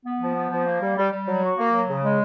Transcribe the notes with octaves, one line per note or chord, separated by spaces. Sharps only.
B3
F3
B3
F3
A#3
G3
G3
G3
F#3
F#4
A#3
F#3
C#3
G#3